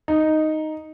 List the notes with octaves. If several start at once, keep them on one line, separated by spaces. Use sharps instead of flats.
D#4